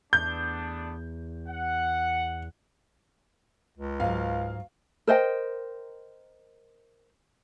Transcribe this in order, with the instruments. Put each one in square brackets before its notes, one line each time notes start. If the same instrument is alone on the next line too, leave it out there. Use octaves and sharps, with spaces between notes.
[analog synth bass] E2 [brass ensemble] A3 B3 D4 [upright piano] G6
[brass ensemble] F#5
[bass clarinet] C#2
[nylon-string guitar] G#2 F#3 [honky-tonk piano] F5
[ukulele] A#4 C5 D#5 G5